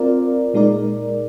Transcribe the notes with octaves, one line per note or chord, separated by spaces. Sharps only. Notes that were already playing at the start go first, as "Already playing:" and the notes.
Already playing: C4 F4 A#4 D5
A#2 G#3 D#4 A#4 D5